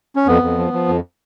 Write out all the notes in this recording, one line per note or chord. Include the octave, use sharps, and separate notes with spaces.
C#4
F2 B3
F2
F3
F3
F2